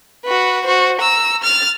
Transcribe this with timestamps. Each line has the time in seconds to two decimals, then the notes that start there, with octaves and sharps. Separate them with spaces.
0.25 F#4 B4
0.64 F#4 C5
1.00 A#5 E6
1.43 F6 A6